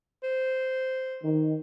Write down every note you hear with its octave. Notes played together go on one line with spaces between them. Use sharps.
C5
D#3